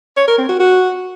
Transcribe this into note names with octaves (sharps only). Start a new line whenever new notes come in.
C#5
A#4
C4
F#4
F#4